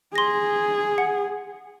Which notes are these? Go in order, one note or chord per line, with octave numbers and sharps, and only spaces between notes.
G#4 C6 A#6
F#5